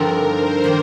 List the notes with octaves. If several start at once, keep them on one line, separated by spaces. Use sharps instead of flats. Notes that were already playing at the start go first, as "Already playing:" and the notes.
Already playing: G2 D3 F3 C4 D#4 A#4
C5
D#3 A#3